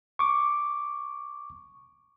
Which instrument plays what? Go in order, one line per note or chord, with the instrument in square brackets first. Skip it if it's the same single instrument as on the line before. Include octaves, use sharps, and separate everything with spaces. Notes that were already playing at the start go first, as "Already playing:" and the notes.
[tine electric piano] C#6 D6